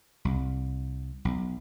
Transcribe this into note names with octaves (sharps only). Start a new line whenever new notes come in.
C2
B1